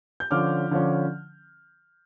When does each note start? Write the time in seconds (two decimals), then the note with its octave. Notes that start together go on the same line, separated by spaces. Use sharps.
0.20 G6
0.31 D3 F3 C#4 D6 F6
0.71 D3 F3 C#4